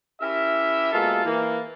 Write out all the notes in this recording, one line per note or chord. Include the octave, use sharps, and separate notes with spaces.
C#4 E4 G4 A#4 E5
B2 G#3 A#3 F4 A4
E3 A#3